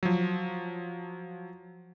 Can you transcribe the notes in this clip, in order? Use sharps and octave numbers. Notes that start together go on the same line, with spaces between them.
F3 F#3